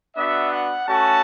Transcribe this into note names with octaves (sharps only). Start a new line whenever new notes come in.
B3 D4 F#4 E5
F#5
A3 C#4 F#4 A5